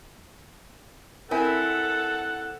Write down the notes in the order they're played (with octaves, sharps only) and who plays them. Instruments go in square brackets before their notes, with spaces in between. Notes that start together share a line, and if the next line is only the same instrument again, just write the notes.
[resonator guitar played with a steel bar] C4 E4 [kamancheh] A4 [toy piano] A#4 G#5 [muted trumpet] F#5